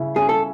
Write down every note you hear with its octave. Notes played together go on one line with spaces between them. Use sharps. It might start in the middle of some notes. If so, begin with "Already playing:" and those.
Already playing: C#3 E4
C#4 G#4
A4